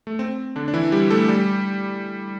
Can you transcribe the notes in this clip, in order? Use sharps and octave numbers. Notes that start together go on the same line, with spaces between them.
A3
C4
D3 D4
D4
E3 E4
G3 G4
A3 A4
G3 G4